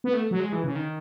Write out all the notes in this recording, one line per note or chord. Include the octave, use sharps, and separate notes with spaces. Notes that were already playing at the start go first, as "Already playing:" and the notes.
B3
A3
F#3
G#3
E3
C#3
D#3